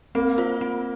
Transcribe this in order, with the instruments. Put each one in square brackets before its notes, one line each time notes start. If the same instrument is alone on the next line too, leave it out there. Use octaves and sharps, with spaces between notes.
[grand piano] A#3 [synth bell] C4
[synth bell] F4 C5
C4